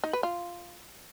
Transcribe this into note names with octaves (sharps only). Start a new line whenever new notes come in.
D#4
B4
F4